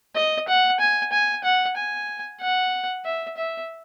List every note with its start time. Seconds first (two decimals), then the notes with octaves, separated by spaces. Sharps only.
0.15 D#5
0.48 F#5
0.80 G#5
1.12 G#5
1.43 F#5
1.76 G#5
2.41 F#5
3.04 E5
3.37 E5